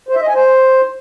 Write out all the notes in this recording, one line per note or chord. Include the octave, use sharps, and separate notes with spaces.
C5
E5
D#5
G#5
C5